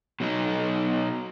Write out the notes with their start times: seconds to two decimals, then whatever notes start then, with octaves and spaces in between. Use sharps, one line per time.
0.20 B2 F#3 D#4